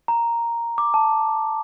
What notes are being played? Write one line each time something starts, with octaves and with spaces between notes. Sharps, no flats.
A#5
D6
A5